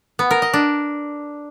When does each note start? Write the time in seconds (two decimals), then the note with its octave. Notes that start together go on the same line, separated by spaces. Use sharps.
0.19 B3
0.31 A#4
0.42 D#5
0.53 D4